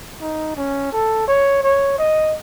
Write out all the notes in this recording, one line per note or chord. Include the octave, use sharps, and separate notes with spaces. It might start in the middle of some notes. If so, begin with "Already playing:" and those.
D#4
C#4
A4
C#5
C#5
D#5